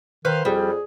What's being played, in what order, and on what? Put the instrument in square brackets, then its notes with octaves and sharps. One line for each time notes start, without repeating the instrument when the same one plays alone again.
[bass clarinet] D#3 [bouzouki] B4 C5 F5
[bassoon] F2 [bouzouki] G3 [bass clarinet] G#4